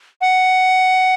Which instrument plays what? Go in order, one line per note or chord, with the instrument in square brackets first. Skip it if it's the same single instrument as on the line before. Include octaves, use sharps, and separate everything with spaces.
[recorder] F#5